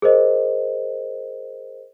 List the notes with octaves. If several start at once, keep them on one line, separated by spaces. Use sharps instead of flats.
G#4 A#4 C5 D#5